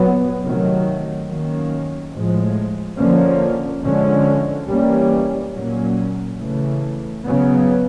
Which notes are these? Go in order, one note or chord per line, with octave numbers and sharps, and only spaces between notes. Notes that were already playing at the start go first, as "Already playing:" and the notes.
Already playing: A#2 F#3 B3
C3 D#3 F#3 A3
D#3 F#3 A#3 C#4
A2 F3 G#3
D3 F3 A#3 C#4
D3 F3 G#3 C#4
E3 G3 A#3 C#4
A#2 F#3 A#3 C#4
C#3 E3 A3
C#3 F#3 B3